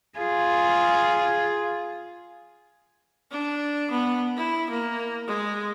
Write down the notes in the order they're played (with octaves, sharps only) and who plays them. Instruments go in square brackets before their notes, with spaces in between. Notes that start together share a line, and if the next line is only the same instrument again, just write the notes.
[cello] F4 G#4
[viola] D4
B3
E4
A#3
G#3